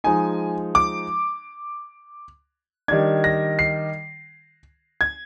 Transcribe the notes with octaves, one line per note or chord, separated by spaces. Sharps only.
F3 G#3 D#4 G#5
D6
D#3 G3 D4 G#6
A#6
C7
G#6